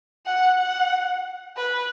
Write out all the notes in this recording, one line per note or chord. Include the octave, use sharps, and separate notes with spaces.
F#5
F#5
B4